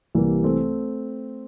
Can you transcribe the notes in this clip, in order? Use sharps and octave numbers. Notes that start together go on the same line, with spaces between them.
C2 C3 E3 G3 A#3
A3 C4